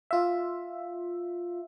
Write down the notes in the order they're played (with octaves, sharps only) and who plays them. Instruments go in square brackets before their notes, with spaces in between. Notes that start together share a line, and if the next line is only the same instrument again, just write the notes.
[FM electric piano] F4 E5